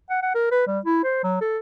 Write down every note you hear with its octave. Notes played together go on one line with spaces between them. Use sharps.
F#5
F#5
A#4
B4
G3
E4
C5
F#3
A4